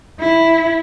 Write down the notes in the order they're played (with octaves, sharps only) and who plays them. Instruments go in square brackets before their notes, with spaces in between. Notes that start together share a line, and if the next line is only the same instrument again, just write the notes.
[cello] E4